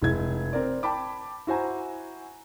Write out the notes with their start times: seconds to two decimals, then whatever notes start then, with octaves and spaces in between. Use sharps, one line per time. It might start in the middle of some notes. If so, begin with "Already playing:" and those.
0.02 F1 G#3 E4 G#6
0.53 C4 A#4 D5
0.83 G5 A5 B5 D6
1.47 E4 F#4 C5 G#5 A#5